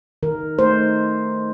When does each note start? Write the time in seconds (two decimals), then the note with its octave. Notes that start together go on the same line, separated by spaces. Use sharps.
0.23 D#3 A#4
0.58 A3 D#4 C5